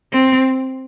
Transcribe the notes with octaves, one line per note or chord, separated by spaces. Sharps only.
C4